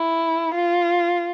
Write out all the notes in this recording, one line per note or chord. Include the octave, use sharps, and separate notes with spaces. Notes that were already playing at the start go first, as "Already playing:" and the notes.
Already playing: E4
F4